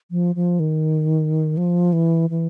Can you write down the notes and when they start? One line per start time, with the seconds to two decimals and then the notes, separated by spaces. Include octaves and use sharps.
0.11 F3
0.35 F3
0.60 D#3
1.57 F3
1.93 E3
2.30 E3